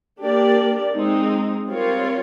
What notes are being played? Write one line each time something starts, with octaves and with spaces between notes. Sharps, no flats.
A#3 D4 G4 A#4 D5
G#3 C4 D#4
G3 C4 F4 A#4 C#5